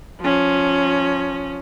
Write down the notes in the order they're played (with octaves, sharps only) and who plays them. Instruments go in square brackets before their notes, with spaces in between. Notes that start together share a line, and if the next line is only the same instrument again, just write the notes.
[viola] F3 C#4